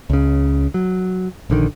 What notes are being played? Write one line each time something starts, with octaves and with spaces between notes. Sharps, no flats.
C#2 C#3
F#3
A#1 D3 D#3